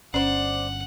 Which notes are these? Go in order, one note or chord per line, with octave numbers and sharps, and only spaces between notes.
G1 C#4 C5 D5 F#5